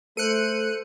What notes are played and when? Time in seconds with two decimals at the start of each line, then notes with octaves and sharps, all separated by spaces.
0.17 A3 A4 C5 F#6 C#7 D#7